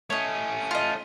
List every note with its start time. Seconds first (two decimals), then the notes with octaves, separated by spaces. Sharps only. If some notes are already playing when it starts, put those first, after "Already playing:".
0.10 A3 C#4 C#5 D#5
0.71 F4 D#5